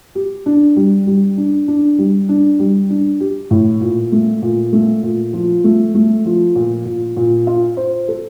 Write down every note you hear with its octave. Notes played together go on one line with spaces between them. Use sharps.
G4
D4
G3
G3
D4
D4
G3
D4
G3
D4
G4
A2
A#2
A3
A#2
A3
A#2
F3
A3
A3
F3
A#2
A#2
A#2
F4
C5
A4